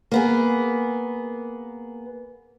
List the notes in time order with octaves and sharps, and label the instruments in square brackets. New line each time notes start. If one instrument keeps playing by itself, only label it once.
[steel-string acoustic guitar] A#3 B3 G#4